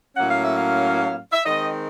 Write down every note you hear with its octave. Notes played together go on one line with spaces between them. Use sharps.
A2 F#3 A#3 C#4 F#5
F5
E5
F5
E5
D#3 G#3 C4 D#5